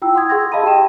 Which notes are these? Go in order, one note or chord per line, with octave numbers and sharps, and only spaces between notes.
E4 F4 G5 E6
F#5 C6 D#6 G#6
G#4 F#5 C6 E6 G#6 A#6
G#4 D#5 F5 A5 B5 D#7
G4 G#4 G5 E7